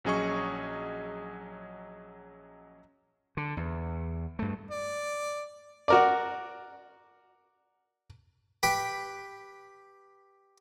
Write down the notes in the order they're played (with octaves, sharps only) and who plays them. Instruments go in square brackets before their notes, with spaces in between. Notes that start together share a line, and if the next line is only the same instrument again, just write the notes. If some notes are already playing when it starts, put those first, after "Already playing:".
[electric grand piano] A#1 F#3 C#4 G#4 D#5 C#6
[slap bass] D3
E2
G2 A3
[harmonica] D5
[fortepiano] F#4 A#4 D5
[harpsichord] G4 B4 G5